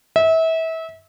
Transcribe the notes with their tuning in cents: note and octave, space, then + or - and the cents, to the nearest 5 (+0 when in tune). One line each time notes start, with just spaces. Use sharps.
E5 -30